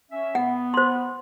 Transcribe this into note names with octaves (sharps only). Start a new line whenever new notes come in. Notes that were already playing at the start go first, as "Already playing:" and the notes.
C#4 E5
B3 F#5
C5 C6